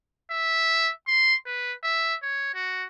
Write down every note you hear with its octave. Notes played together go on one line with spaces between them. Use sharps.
E5
C6
B4
E5
C#5
F#4